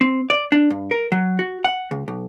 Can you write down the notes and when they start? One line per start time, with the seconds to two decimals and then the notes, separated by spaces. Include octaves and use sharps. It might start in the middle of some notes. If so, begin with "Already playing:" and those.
0.01 C4
0.30 D5
0.52 D4
0.70 G2
0.91 A#4
1.12 F#3
1.39 F#4
1.64 F#5
1.91 C#2
2.08 B1